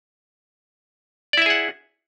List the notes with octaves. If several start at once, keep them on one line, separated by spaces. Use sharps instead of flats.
E4 G#4 D5 E5 F#5